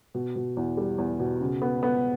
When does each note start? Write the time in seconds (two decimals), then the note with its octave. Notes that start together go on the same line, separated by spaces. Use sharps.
0.14 B2
0.36 B2
0.57 E2
0.77 G3
0.98 E2
1.20 B2
1.41 C#3
1.62 B3
1.83 B3